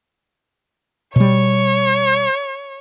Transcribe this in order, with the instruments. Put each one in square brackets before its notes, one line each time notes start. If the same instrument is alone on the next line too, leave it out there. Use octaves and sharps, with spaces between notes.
[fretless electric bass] B2 G3 [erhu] C#5